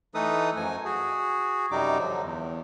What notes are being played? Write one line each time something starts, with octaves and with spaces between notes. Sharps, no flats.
E3 A3 D#4 A4 B4 D#6
F#2 F3 G#5
F#4 G#4
F#2 C3 G3 D#4 D6
D3 F3 F#3
E2